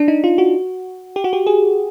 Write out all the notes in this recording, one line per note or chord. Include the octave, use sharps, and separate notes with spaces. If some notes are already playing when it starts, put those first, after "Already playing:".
Already playing: D4
D#4
F4
F#4
G4
F#4
G4
G#4